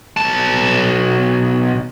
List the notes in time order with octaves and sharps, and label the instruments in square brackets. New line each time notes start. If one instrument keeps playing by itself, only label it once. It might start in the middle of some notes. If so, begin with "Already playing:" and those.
[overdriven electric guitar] B1 A5